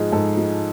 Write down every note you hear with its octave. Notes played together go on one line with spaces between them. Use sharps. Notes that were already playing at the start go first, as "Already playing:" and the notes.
Already playing: G#2 F3 G#3 G#4
G#2 A4
F3 G#3